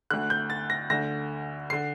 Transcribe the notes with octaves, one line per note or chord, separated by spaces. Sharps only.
D2 D3 F#6
G6
A6
A#6
D2 D3 A#6
D3 C7